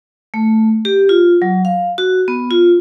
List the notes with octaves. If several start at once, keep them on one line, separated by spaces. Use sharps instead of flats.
A3
G4
F4
F#3
F5
F#4
B3
F4